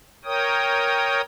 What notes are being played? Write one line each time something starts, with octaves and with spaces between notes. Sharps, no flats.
A#4 C#5 G5 D#6